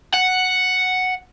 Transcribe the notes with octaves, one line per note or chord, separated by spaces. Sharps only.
F#5